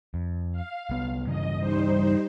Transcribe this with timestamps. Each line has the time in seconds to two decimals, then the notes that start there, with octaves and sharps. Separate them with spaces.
0.14 F2
0.52 F5
0.90 C2 B3
1.27 G2 C#3 E3 D#5
1.59 G3 D#4 C5